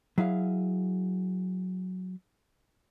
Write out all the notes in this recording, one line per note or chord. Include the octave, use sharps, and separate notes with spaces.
F#3 E4 G#4 F5